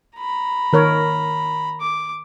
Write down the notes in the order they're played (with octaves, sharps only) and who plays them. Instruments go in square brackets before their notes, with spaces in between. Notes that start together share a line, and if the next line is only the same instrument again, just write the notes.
[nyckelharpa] A#5 B5
[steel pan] D#3 A#4 C#5
[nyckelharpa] D6